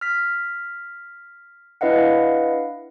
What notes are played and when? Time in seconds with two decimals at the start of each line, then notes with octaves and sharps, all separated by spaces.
0.01 F6 B6
1.81 D4 E4 B4 D#5 F5 F#5